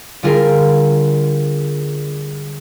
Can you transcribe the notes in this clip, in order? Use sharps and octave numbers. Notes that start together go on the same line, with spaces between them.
D3 G3 F4 G#4 A#4